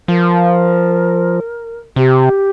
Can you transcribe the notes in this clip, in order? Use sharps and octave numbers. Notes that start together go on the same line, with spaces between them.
F3 A#4
C3 G4